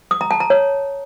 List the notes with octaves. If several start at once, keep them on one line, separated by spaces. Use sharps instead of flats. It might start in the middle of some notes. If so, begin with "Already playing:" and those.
D#6
A#5
A5
A#5
C#5